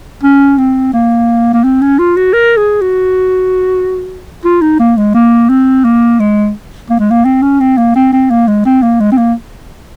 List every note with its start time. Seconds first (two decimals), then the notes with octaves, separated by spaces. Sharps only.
0.23 C#4
0.58 C4
0.93 A#3
1.54 A#3
1.64 C4
1.81 C#4
1.99 F4
2.16 F#4
2.33 A#4
2.57 G#4
2.81 F#4
4.45 F4
4.61 D#4
4.80 A#3
4.97 G#3
5.15 A#3
5.49 C4
5.84 A#3
6.19 G#3
6.90 A#3
7.00 G#3
7.11 A#3
7.25 C4
7.42 C#4
7.60 C4
7.77 A#3
7.96 C4
8.13 C4
8.30 A#3
8.48 G#3
8.66 C4
8.83 A#3
9.00 G#3
9.12 C4
9.17 A#3